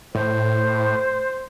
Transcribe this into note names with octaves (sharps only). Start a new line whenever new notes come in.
A2 C5